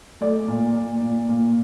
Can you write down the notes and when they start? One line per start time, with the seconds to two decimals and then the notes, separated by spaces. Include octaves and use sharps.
0.21 A3 D5
0.48 A#2
0.75 A#2
1.01 A#2
1.29 A#2